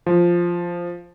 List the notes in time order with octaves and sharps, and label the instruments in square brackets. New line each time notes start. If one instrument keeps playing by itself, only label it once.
[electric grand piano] F3